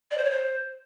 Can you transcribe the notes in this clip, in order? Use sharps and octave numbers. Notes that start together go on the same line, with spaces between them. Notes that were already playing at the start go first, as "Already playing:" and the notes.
D5
C5
C#5
C5